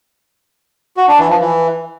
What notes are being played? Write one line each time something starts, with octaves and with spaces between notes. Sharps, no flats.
F#4
D4
E3
F3
E3